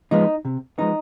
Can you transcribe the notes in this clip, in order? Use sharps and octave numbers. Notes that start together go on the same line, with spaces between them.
F3 G#3 B3 D#4
C3
F3 G#3 B3 D#4